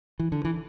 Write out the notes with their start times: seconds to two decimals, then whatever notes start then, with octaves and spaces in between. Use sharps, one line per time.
0.20 E3
0.32 D3
0.45 E3